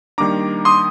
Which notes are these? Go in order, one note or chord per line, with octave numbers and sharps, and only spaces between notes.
D#3 G3 A#3 D4 A#5 D6
C6 D#6